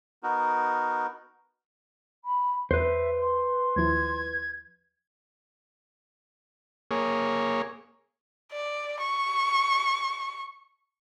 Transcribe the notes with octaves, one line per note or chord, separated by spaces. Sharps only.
B3 D#4 F#4 A#4
B5
E2 B4 C5 E5
C6
D#2 F3 E4 G#6
A#3 G#4 C#5
D5
C#6